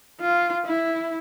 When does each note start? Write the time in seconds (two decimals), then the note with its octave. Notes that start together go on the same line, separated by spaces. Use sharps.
0.21 F4
0.65 E4